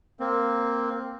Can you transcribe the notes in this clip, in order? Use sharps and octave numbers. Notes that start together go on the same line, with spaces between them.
A#3 C4